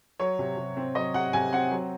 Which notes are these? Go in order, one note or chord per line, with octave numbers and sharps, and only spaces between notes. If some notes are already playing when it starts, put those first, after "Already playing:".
F#3 C#5
C3
C3
C4
F#3 D#5
C3 F#5
C3 G#5
C4 F#5
F#3